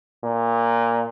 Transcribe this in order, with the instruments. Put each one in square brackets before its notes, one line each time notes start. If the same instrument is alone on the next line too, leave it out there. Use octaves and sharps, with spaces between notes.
[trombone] A#2